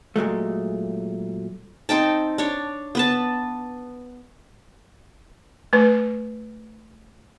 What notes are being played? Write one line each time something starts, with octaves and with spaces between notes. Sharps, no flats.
A#2 F#3 G#3 A3
C4 D#4 G5 A5
D4 C#5
B3 B4 A5
A3 B4